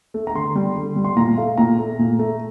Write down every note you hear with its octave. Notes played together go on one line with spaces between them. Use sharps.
A3
A#5
D3 C6
G3
D3
G3
C6
A#2 A#5
A3 F5
A#2 A#5
A3
A#2
A3